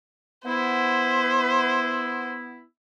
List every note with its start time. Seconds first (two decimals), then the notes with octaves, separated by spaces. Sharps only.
0.46 B3 E4 C5